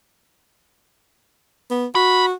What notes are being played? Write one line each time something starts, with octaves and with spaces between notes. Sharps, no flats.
B3
F#4 B5